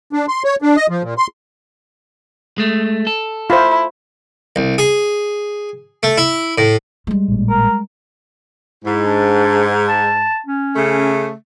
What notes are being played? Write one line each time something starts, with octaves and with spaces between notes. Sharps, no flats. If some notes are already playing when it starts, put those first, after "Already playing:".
D4
C6
C#5
D4
D#5
F3
A#2
C6
G#3 A3
A4
E4 F4 C5
C2
G#4
A3
E4
A2
G3 G#3
A1 A#2
A#4
G#2 E4
D4
A5
C#4
C#3 A3